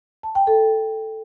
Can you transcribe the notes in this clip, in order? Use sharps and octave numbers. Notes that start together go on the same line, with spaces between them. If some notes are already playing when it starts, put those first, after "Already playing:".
A5
G5
A4